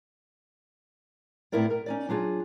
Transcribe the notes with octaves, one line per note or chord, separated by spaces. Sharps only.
A2 B3 C4 E4 A#4 D5
A#4
C#4 D#4 D5
F#3 D4 F4 G#4